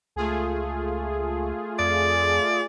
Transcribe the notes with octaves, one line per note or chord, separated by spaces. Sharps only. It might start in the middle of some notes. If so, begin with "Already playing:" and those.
C#2 A3 F4 G#4
F2 D5